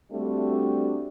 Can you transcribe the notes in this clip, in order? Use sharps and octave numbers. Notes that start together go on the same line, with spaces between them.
G3 A3 C4 D4 F#4